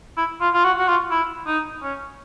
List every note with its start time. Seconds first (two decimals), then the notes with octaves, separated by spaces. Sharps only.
0.17 E4
0.41 F4
0.54 F4
0.65 F#4
0.79 F#4
0.88 F4
1.11 E4
1.47 D#4
1.83 C#4